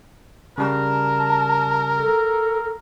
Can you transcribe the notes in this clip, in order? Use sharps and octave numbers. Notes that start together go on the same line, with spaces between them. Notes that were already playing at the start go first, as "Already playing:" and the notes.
C#3 G3 A#4 A5
A4